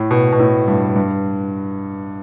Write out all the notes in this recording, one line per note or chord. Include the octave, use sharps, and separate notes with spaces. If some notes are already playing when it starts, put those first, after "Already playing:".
Already playing: A2
B2
B2
A2
G2
G2